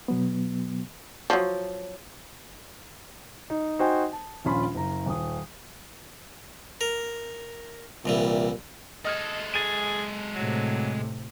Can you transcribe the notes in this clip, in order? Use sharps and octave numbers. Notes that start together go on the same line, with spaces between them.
B2 F#3 B3
F3 F#3
D#4
D#4 F#4 C5 G5 G#5
A5
D#1 A#1 C#4 F4 B5
F#1 A#5
D#1 D#6
A#4
C2 A#2 E3 G3
G#3 A4 D#5 F6 G#6
G#4 A6 D#7
A2 C3 F#3